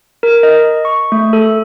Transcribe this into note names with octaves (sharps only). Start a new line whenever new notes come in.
A#4
D#5
C#6
A3
A4